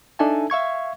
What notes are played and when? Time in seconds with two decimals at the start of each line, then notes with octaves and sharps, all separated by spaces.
0.19 D4 D#4 A4 E5 G#5 A5
0.50 E5 F5 C#6 G#6